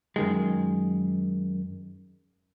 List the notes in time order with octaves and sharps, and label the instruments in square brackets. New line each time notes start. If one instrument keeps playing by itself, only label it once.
[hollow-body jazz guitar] F#2 D#3 G#3